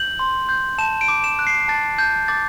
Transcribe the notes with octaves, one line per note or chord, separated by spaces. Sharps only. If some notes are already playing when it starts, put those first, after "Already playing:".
Already playing: G6 F#7
C6
G6
A5 E7
D7
D6
E7
F#6
C7
A5 A6
A5 G6
D6 A6